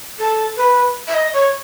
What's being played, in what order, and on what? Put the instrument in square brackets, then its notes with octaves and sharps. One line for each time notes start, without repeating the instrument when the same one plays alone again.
[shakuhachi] A4
B4
E5
D#5
C#5